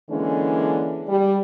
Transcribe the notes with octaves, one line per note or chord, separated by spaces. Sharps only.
D3 E3 G#3 A#3 C#4 D4
G3